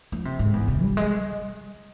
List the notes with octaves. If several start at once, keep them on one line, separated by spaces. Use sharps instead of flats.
F3
C3
G#2
E2
C3
G3
G#3